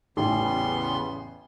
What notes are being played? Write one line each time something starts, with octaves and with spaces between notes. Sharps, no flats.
A1 E2 C#3 G3 B3 C#4 C6